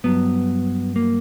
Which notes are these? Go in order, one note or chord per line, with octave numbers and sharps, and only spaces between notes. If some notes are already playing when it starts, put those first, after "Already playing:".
G2 F#3 B3
A#3